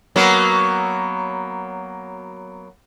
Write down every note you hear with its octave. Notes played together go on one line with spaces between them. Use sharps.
F#3 A#3 B3